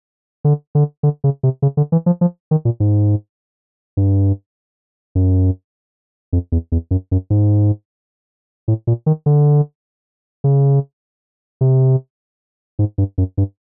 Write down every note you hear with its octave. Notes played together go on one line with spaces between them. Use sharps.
D3
D3
D3
C#3
C3
C#3
D3
E3
F3
F3
D#3
A#2
G#2
G2
F#2
F2
E2
E2
F#2
F#2
G#2
A2
A#2
D#3
D3
C#3
C3
G#2
G2
F#2
G2